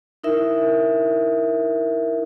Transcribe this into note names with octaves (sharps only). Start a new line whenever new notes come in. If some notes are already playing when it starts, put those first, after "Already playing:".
D#4 E4 A#4 E5